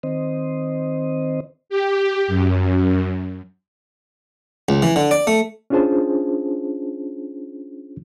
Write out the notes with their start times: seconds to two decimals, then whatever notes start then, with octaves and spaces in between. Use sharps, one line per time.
0.03 D#3 C4 C5 D#5
1.70 G4
2.28 F#2
4.69 C#2
4.82 E3
4.96 D3
5.11 D5
5.27 A3
5.70 C#4 D4 F4 G#4 C5 A5